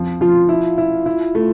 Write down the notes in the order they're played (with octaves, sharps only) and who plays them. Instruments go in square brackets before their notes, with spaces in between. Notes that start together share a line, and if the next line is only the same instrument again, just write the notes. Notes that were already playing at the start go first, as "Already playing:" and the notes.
Already playing: [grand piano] F2 F3
[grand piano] F3 [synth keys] F4
[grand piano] E4
E4
E4
A3